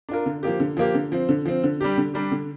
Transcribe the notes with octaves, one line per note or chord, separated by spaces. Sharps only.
D4 F4 A#4
D3
F3 A#3 G4
D3
F3 A#3 G4
D3
F3 C4
D3
F3 C4
D3
G3 D4 G4
D3
G3 D4 G4
D3